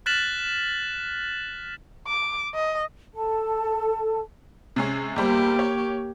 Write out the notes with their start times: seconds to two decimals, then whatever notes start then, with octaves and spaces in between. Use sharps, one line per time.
0.06 F6 F#6 A6 B6 E7 F#7
2.07 D6
2.55 D#5
3.14 A4 A5
4.76 C3 G#3 C#4
5.16 E2 G3 A#3 G4 C5
5.59 C#5